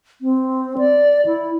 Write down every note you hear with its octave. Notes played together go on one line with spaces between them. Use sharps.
C4
D5
E4